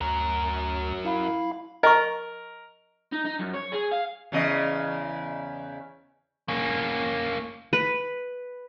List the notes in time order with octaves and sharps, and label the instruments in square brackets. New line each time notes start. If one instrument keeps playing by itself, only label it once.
[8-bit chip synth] D2 [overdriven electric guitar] F#3 A#4
[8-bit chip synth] E4 F5 B5
[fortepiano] A#4 [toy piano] D#5 C#6
[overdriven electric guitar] D#4
D#4
F#2
C#5
G#4
F5
[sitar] E2 C#3 D#5
[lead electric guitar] A#3 C#4
[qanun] B4